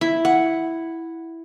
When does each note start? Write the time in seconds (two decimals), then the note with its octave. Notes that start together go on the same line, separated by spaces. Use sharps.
0.01 E4
0.25 F#5